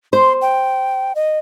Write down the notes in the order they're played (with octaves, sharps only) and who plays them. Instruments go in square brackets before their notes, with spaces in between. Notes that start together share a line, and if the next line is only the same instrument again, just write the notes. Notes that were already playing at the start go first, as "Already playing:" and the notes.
[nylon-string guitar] C5 [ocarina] C6
[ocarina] G5
D#5